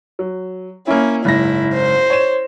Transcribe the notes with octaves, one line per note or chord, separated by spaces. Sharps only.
F#3
A#3 C#4 E4
F#1 G#2 E4 A#6
C5
C#5 E7